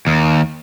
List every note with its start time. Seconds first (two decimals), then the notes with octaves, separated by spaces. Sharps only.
0.07 D#2